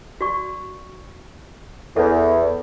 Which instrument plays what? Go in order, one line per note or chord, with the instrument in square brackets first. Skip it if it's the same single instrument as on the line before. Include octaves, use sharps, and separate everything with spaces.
[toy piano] F#4 D5 C#6
[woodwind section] E2 [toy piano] A4 E5